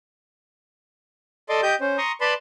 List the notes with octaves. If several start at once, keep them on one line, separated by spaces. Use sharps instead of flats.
A4 D5 D#5 C6 D6
G4 D#5 G6
C#4 C5
A#5 C6 C#6 D#6
B4 D5 A5 B5 C6